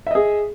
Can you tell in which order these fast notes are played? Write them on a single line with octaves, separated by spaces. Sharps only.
E5 D#5 G#4